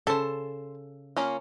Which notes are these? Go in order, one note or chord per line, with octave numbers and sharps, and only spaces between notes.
C#3 A4 C5 A5
A#3 C#4 F4